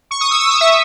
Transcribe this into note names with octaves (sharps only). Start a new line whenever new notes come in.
C#6
D#6
E6
D#6
C#6
E5